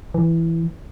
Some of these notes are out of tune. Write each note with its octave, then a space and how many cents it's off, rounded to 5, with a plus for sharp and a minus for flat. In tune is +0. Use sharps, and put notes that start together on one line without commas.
E3 +5